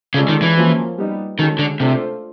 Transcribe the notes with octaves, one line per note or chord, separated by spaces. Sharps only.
C#3 G#3 C#4 F4 A4 D5
D#3
E3
F3 A#3 C#4 F#4
G3 B3 D#4
D#3 G#3 C#4 F#4 A4
D3
C3 A3 D4 F4 A4 C5